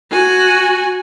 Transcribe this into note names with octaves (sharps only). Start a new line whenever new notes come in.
F#4 G#5